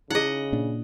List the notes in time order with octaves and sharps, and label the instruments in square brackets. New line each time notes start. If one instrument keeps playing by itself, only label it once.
[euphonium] C#3 [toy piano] D#4 E4 G#4 [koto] D#5 F#5
[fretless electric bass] A#2 D4